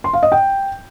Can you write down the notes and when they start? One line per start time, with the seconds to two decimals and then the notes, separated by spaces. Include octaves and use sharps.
0.04 C6
0.13 F5
0.23 D#5
0.32 G5